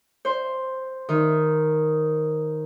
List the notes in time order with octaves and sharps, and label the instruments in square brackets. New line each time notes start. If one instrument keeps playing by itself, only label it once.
[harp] C5
D#3